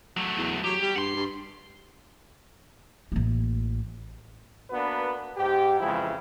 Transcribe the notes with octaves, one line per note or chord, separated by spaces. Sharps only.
F#3 A3
E2
F#3 G4
G3
G2 F#5 C6
G2
A1 A#3
A#3 B3 D4 F#4 B4
G#2 G4
F2 C#3 E3 F3 G#3 E4